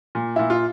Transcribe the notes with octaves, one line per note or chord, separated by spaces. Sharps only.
A#2
A#2 E4
F4